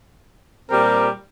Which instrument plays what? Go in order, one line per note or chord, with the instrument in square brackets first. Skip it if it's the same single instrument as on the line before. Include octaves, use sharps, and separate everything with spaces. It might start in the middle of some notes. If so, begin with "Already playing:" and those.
[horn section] A#2 G3 C4 G4 A#4